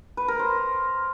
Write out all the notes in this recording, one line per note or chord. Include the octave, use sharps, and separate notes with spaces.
B4
A#4
C5